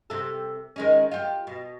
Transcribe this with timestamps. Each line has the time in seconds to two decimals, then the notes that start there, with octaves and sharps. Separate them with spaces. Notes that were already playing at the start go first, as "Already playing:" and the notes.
0.10 C3 A4
0.76 D#3 G#3 C#4
1.11 F4 G4
1.47 B2